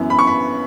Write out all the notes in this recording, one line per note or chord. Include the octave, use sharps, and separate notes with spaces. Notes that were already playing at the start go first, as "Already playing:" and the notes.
Already playing: F#2 E3 B3
B5
C#6
B5